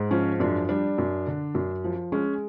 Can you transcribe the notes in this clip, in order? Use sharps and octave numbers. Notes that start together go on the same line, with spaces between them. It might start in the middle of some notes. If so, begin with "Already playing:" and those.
Already playing: G#2 G#3
F3 C#4
F#2 D4
G3 D4
F#2
D3
F#2
F3
G#3 C#4